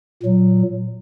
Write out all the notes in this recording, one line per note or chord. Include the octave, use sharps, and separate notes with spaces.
A#2 F#3